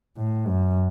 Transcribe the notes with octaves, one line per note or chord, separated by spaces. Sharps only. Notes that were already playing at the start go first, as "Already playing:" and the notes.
A2
F#2